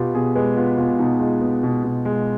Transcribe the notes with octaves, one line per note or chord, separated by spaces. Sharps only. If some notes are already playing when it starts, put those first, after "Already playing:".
Already playing: B2 B3 F4 G4
B2 G#4
G#3 B4
B3 F4
B2 F4
B2 D#4
G#3 F4
B3
B2
B2
G#3